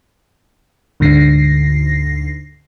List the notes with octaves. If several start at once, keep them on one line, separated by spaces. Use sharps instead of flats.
D2 G#2 D3 A#6 C7